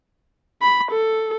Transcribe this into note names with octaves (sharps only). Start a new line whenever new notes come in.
B5
A4